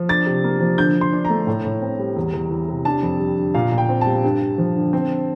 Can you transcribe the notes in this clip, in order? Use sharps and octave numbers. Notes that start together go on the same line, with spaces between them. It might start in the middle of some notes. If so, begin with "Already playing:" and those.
Already playing: F3
D4 A6
C3
A#3
F3
D3 G6
D3
C6
D4
A#5
A3
A2
A2
C4
G3
E2
E2
E3
C3
D4 A5
F2
G3
D3
A#2 F5
A#2
G5
C4
A5
G3
G2
G2
F3
D3
C4